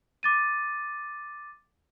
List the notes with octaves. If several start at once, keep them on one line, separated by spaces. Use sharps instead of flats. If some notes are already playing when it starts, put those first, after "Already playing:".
D6 A6 D#7